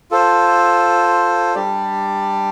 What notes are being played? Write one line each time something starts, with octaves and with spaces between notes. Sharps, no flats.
F4 A4 C5
G3 D4 G4 D5